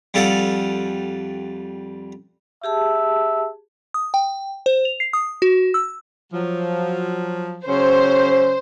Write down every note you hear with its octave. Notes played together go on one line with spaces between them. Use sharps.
F2 G3 F4 A4 F5 F#5
G4 G#4 E5 A5
D#6
G5
C5
F7
C7
D#6
F#4
E6
F3 F#3
C#3 F#3 C#4 C5